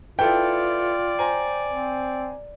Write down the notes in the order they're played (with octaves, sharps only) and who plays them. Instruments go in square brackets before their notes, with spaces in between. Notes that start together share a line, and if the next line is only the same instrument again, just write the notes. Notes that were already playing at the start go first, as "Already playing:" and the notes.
[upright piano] E4 A4 B4 [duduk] F4 [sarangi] D5 [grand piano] G5
[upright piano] C5 G#5 A#5
[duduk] C4